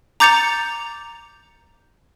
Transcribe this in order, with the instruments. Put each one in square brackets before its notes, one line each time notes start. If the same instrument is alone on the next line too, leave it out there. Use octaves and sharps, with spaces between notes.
[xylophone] A#5 D6 G6 A6 C#7 F7